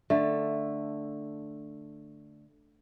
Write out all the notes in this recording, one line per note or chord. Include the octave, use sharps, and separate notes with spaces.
D3 A3